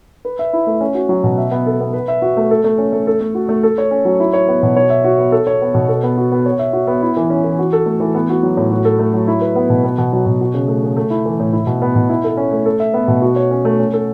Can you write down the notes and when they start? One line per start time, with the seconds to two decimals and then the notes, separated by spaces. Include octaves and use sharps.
0.25 B4
0.39 E5
0.53 E4
0.67 A3
0.81 C#4
0.95 F#4
1.09 F#3
1.24 B2
1.38 E5
1.51 B3
1.66 A4
1.80 B3
1.93 B4
2.08 E5
2.22 F#4
2.37 A3
2.51 A4
2.64 A3
2.78 C#4
2.93 A3
3.07 A4
3.20 A3
3.35 F#4
3.49 A3
3.63 A4
3.78 C#5
3.91 C#4
4.05 F#3
4.20 E4
4.33 C#5
4.48 B3
4.63 B2
4.76 C#5
4.90 E5
5.04 F#4
5.18 B3
5.32 A4
5.47 C#5
5.61 B3
5.74 B2
5.88 A4
6.03 B3
6.17 F#4
6.32 B3
6.46 C#5
6.59 E5
6.73 F#4
6.87 B3
7.02 E4
7.17 E3
7.30 C#4
7.44 E3
7.59 F#4
7.73 A4
7.86 A3
8.00 E3
8.14 B3
8.29 F#4
8.43 F#3
8.57 A2
8.71 F#4
8.85 A4
8.99 A3
9.13 F#3
9.27 E4
9.41 B4
9.56 B3
9.70 B2
9.84 B3
9.98 B2
10.13 F#3
10.26 B2
10.41 F#4
10.54 C#3
10.68 A3
10.83 C#3
10.96 A3
11.10 E4
11.25 E3
11.40 A2
11.53 E4
11.67 B2
11.82 B3
11.95 B2
12.09 E4
12.24 A4
12.37 C#4
12.52 A3
12.66 A4
12.80 E5
12.94 B3
13.08 B2
13.22 F#4
13.36 C#5
13.51 C#4
13.65 A3
13.79 C#4
13.93 A4